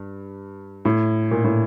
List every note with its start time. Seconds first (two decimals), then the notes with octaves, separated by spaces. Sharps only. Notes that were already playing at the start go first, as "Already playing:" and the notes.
Already playing: G2
0.85 A2
1.31 A#2
1.44 A2